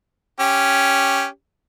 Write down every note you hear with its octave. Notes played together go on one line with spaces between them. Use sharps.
C#4 G4